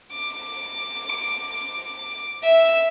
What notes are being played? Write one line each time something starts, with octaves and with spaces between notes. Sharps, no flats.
D6
E5